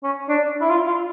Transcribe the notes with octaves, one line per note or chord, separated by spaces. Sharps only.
C#4
D4
E4
F4
F4